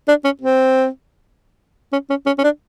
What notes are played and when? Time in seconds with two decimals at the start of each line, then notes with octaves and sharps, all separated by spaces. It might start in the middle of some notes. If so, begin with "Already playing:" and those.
0.08 D4
0.25 C#4
0.42 C4
1.92 C#4
2.10 C#4
2.26 C#4
2.38 C#4
2.44 D4